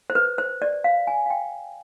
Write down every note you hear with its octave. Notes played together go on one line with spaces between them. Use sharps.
C5
B4
C5
D5
F5
G#5
F5
G5